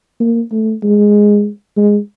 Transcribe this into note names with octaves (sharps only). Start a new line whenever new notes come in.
A#3
A3
G#3
G#3